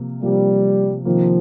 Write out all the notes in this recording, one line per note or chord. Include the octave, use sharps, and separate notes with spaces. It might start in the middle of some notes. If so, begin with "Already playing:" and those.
Already playing: C3 F3 A#3
C3 F3 G3 A#3
C3 D#3 F3 A#3